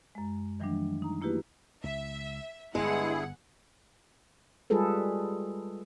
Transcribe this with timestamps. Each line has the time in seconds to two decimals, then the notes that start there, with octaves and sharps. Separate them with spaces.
0.15 F#2 G#3
0.60 D#3 E3 F#3 G3 A3 D4
1.02 D#4 A#5
1.21 A3 A#3 E4 F#4 G4 B4
1.84 C#2 E5
2.75 G1 G2 G#3 B3 E4 G#4 F#5
4.70 G3 G#3 F4 G#4 A4 B4